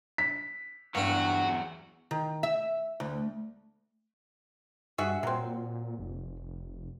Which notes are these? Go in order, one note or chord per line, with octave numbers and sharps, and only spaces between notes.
B6
E2 G2 D3 F#3 F#4
D#3
E5
D2
G2 F#4 G#4 E5
A#2 F#3 C4
F1